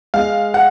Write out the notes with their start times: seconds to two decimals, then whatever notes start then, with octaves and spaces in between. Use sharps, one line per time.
0.14 G#3 F5
0.54 F#5